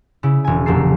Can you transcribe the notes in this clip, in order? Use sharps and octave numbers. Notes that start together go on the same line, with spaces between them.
C#3 E4
E1 G#5
F1 A#1 A#3 A4 C7